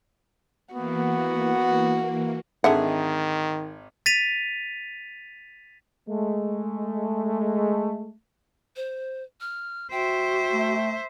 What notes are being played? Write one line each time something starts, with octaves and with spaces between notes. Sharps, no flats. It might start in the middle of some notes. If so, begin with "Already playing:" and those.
E3 A#3 B3 F#4
G#1 D3 D#3 G#4 E5 F#5
A6 B6 D#7 F7
G#3 A3
C5
F6
F#4 C5 E5 G5
A3